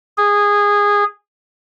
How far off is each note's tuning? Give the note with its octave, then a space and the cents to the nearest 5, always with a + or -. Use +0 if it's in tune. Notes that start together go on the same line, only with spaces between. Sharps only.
G#4 -15